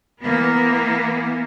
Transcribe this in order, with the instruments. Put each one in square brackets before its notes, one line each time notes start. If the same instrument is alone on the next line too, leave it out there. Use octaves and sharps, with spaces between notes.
[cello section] E3 A#3 B3